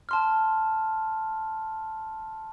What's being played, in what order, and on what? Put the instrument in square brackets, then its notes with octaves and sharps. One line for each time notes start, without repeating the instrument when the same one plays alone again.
[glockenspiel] A5 C6 F6